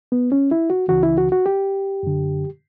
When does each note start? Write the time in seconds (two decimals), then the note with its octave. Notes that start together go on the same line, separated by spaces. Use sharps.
0.12 B3
0.32 C#4
0.51 E4
0.70 F#4
0.88 C#2 C#3 E3 F#4
1.03 E4
1.18 F#4
1.32 F#4
1.46 G4
2.03 F#2 D3